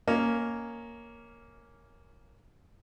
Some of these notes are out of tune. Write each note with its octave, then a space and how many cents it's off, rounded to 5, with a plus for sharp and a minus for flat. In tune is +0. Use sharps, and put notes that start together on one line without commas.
A#3 +0 C#4 +5 D#5 +0